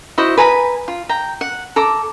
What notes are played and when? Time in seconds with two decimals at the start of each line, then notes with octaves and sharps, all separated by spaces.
0.18 E4 F#4 C5 D#5
0.37 B4 G#5 A#5 B5
0.88 F4
1.09 G5 A#5
1.41 F#5
1.76 A4 A#5 D6